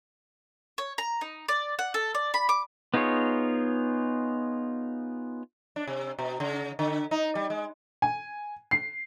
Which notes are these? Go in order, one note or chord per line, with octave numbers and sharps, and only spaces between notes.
C#5
A#5
D#4
D5
F#5
A4
D5
B5
D6
B3 D#4 F4 G#4 C#5
D4
C3
B2
C#3
D3
D#4
G3
G#3
G#5
C7